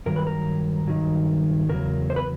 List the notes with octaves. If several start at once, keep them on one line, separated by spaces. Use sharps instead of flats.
G2 D#3 F#3 A#4
B4
A#4
G2 D#3 F#3
E2 C#3 F#3 A#4
C5
B4